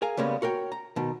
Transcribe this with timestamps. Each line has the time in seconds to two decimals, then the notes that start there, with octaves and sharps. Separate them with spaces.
0.02 G#4 A#4 F5 G#5
0.17 C#3 G3 G#3 A#3 B3 C#4
0.42 F#4 A#4 C#5 G5
0.72 A#5
0.96 B2 D#3